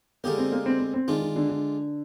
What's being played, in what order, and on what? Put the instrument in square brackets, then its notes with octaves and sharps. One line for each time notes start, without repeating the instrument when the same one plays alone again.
[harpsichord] D3 G#3 D#4 G4 A#4 [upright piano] A#3
[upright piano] C4
A#3
C4
C4
C4
[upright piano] D#3 [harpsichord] G#3 D4 F4
[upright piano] D#3
D3
D3